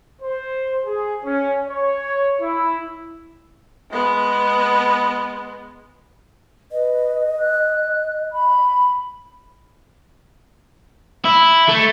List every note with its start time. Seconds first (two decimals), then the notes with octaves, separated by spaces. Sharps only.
0.22 C5
0.84 G#4
1.23 C#4
1.67 C#5
2.41 E4
3.91 G#3 B3
6.72 B4 D#5
7.40 F#6
8.33 B5
11.25 E4
11.69 A3